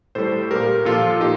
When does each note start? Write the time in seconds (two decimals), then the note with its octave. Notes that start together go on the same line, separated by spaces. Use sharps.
0.15 A2 G3 A4 C5
0.50 A#2 G3 G4 A#4
0.85 A#2 F3 F4 A4
1.20 A#2 D#4 G4